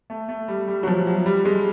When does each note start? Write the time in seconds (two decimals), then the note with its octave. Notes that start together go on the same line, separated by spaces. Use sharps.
0.10 A3
0.29 A3
0.48 G3
0.68 G3
0.83 F#3
0.87 F3
1.07 F#3
1.26 G3
1.45 G#3